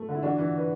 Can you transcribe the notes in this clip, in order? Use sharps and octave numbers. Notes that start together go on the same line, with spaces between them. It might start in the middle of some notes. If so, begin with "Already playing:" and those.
Already playing: A3
D3
E4
E3 D4 F#4
E3
B4